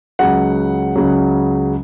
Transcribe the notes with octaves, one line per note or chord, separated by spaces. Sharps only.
C#2 C#3 F#3 F#5
C#2 C#3 F#3